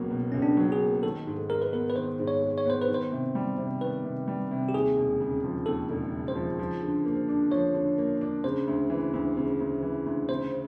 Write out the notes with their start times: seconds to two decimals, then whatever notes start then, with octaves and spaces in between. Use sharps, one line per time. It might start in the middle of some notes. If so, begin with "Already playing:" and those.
Already playing: C#2 B2 F#3 A#3
0.11 B2
0.32 C#2 C#4
0.42 D4
0.57 F#3
0.72 G#4
0.81 A#3
1.03 D#3 A4
1.27 G#2
1.50 G#3 A#4
1.62 B4
1.73 B3 A#4
1.90 B4
1.96 D#3 C5
2.19 G#2
2.28 C#5
2.42 G#3
2.58 C#5
2.66 B3 C5
2.81 B4
2.88 D#3
2.94 C5
3.12 C3
3.35 G3
3.58 C3
3.81 D#3 B4
4.04 C3
4.28 G3
4.51 C3
4.69 G4
4.74 D#2 G#4
4.97 E1
5.20 C#3
5.44 F3
5.66 D#2 A4
5.90 E1
6.13 C#3
6.28 C5
6.35 F3
6.59 F3
6.82 D3
7.05 A#3
7.28 D4
7.51 F3 C#5
7.74 D3
7.98 A#3
8.21 D4
8.44 C#3 C5
8.67 D2
8.90 E3
9.14 D2
9.37 C#3
9.60 D2
9.83 E3
10.06 D2
10.29 C#3 C5